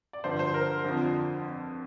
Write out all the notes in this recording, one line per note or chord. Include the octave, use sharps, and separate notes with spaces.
D5
G2 D3 F3 C5
C5
A#4
F2 D3 F3